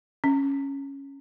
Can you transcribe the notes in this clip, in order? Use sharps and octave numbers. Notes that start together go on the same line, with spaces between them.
C#4